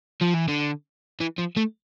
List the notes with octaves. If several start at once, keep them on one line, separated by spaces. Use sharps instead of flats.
F3
E3
D3
E3
F3
A3